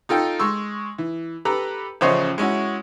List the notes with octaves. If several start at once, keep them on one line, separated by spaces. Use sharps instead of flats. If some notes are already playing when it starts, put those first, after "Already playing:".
D#4 F4 A4 G5
G#3 C6 C#6 E6
E3
G4 A4 B4 A#5
A1 C#3 F3 C5 C#5 D#5
G#3 C#4 E4 F#4